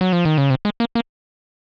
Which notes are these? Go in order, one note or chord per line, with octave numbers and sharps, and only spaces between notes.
F#3
F3
D#3
C#3
C3
G#3
A#3
A#3